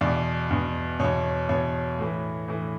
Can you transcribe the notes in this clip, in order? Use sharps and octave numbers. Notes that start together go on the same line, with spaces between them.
E2 B2 D5
E2 B2
E2 B2 C#5
E2 B2 C#5
A2 E3
A2 E3